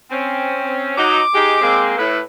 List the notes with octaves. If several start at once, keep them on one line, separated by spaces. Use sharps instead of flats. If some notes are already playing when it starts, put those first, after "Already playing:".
C4 C#4
F#3 D#4 D6
G#3 D#4 G4
G#3 A#3 C4
A2 B4